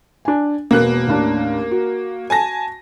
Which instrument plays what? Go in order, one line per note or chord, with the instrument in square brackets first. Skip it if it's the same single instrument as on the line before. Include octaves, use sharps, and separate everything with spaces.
[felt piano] D4 G#5
[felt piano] E1 B3 [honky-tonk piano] A#3 F#6
[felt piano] A1 D#2 D4
F#4
[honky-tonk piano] G#5 A5 A#6